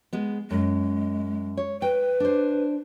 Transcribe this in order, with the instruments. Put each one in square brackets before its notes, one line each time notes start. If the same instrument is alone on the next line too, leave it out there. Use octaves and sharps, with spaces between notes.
[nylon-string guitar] G#3 B3
[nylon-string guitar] F#2 [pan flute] G#3
[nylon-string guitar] C#5
[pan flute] B4 [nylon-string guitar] G5
[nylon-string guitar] D4 C5